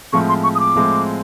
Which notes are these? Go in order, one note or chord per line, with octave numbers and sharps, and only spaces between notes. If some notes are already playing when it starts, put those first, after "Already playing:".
A2 F3 G#3 C4 C#6
C6
C#6
D#6
D6
A2 F3 G#3 C4